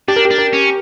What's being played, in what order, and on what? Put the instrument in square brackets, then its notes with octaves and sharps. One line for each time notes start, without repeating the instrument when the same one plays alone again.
[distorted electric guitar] D4 [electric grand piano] G4
[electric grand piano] A#4
G4
[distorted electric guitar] D4
[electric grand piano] A#4
[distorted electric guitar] C#4